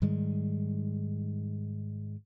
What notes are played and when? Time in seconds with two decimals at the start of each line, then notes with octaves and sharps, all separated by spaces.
0.02 G#2 D#3 G3 G#3